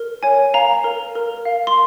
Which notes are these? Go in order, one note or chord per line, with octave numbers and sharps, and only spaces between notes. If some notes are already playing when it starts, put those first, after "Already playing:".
Already playing: A#4
C#5 G#5
F5 A#5
A#4
A#4
F5
C6